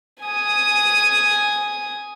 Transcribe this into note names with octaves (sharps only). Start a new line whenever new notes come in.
G#5 D#6